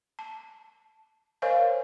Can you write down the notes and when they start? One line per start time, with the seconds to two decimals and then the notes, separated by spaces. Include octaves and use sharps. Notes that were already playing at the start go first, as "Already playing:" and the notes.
0.19 A5
1.42 A#4 C5 C#5 D#5 F5 G#5